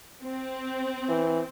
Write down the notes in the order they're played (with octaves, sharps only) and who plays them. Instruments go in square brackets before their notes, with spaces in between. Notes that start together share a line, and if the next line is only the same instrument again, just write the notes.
[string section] C4
[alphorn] E3